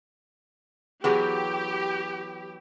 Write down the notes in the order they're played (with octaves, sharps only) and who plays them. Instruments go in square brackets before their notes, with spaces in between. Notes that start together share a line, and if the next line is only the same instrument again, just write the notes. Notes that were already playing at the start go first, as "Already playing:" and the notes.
[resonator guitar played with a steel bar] E3 F#3 B3 [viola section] G4 [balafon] G#4